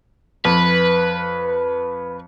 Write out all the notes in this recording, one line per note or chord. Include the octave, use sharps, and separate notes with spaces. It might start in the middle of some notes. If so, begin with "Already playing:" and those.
F2 B4